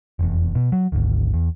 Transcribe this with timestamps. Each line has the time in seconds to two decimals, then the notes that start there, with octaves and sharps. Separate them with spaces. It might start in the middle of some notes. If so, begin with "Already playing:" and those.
0.19 F1 E2
0.55 B2
0.72 F#3
0.92 G#1 D2
1.33 E2